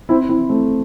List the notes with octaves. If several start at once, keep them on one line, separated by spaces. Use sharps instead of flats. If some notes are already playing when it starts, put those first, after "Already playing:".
C4 E4
C4 E4
A3 C4